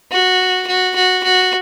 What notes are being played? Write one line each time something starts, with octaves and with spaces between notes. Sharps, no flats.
F#4
F#4
F#4
F#4